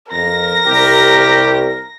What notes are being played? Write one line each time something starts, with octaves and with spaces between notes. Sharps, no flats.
F2 A#4 A#6
C2 G4